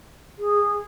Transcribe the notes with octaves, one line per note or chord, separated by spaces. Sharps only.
G#4